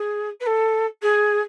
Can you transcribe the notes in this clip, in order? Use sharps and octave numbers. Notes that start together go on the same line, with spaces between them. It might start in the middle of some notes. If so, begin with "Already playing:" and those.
Already playing: G#4
B4
A4
G#4